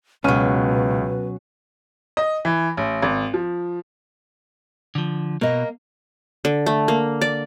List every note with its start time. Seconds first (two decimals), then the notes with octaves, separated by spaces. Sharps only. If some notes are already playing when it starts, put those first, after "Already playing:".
0.24 C#2 B2 F#3 C#4 B4 F6 D#7
2.17 D#5
2.45 E3
2.77 A1
3.02 G#1
3.34 F3
4.95 D3 F3
5.41 B2 A#3 D#5
6.45 D3
6.66 A3
6.88 A#3
7.21 D5